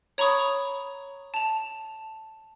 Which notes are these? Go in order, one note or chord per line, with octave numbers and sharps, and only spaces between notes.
C#5 A#5 B5 C#6 D#6
A5 F7